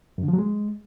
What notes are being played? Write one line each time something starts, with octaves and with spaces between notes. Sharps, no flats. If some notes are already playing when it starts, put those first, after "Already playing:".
F#2
D3
F3
F#3
G#3